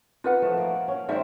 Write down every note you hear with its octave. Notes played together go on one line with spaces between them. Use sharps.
D#4 F4 B4 F#5
F3 A3
A#3 D5
C#4
G#3 C4 D#4 D5 E5